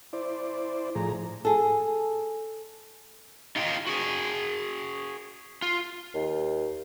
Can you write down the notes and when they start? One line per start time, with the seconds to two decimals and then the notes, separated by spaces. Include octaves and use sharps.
0.13 E4 C5 D5
0.95 A2 F3 G#4 A#5
1.45 G#4 A4
3.56 D#4 F4 G4 G#4 D#5 F5
3.87 F#4 G#4
5.62 F4
6.14 D#2